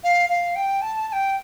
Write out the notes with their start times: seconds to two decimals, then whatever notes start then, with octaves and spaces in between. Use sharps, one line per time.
0.04 F5
0.30 F5
0.55 G5
0.82 A5
1.08 A5
1.13 G5